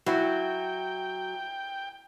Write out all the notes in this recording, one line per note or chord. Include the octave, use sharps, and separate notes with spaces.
F#3 E4 F#4 G5